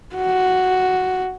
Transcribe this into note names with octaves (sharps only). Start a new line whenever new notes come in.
F#4